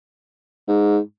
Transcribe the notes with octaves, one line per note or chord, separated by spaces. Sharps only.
G#2